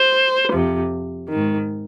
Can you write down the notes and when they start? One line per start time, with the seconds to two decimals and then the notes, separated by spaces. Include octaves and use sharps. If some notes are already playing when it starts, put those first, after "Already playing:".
Already playing: C5
0.53 F2 C3 F3
1.29 D#3
1.34 G#2